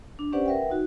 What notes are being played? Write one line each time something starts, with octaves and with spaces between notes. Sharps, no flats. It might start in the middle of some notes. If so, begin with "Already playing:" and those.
D4
C#4 G4 B4 C5 D5 F#5
A#4 B4 E5 F#5 G5
D#4 F#4